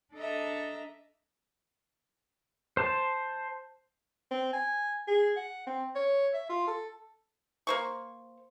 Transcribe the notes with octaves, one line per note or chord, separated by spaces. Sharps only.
D4 A4 D#5 E5 A#5
C5 A5
C4
G#5
G#4
F#5
C4
C#5
E5
F4
A4
A#3 C5 C#6